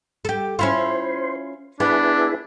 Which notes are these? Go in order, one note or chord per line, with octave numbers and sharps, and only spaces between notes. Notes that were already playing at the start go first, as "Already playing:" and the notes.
G4 A4
C#4 E4 F4 C5
B3 D4 E4 G#4 B4